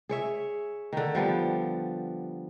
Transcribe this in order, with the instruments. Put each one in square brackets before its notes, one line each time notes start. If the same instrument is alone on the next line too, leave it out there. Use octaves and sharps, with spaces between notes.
[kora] G#4 C#5 E5
D3 D#3
F3 G3 B3